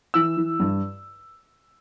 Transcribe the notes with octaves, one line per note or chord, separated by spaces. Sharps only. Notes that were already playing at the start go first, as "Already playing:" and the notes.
E3 E6
E3
G2